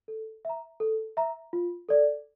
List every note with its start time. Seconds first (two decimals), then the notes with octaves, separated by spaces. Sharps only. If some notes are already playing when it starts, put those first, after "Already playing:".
0.08 A4
0.45 E5 A#5
0.80 A4
1.17 E5 A#5
1.53 F4
1.89 A4 D5